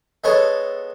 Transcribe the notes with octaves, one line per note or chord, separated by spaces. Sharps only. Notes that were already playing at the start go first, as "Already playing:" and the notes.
G#3 B3 A4 C#5 D#5